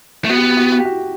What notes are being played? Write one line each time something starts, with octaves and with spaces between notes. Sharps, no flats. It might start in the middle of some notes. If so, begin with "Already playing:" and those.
A3
B3 F#4
G4
F#4
G4
F#4
G4
F#4
G4
F#4